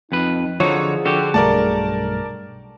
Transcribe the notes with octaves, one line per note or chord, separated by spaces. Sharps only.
F2 D#4 B4
D3 F3 D#4 F#4 G#4 C#5
D3 F#4 G4
B1 G2 A3 A#4 D5 A5